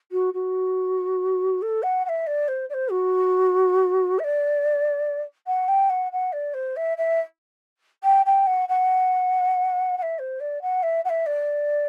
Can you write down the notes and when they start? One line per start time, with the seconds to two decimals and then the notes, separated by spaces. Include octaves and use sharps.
0.12 F#4
0.34 F#4
1.62 A4
1.83 F#5
2.05 F#5
2.09 E5
2.27 D5
2.48 C5
2.69 D5
2.74 C5
2.91 F#4
4.19 E5
4.24 D5
5.47 F#5
5.68 G5
5.89 F#5
6.12 F#5
6.32 D5
6.54 C5
6.76 E5
6.97 E5
8.04 G5
8.26 G5
8.47 F#5
8.69 F#5
9.98 F#5
10.02 E5
10.19 C5
10.40 D5
10.62 F#5
10.83 E5
11.05 F#5
11.09 E5
11.26 D5